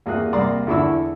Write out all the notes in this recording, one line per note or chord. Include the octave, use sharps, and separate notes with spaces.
E2 A#3 G4 G#4 F#6
C2 A#3 D5 A#5 C6
E2 D3 E4 C#6 E6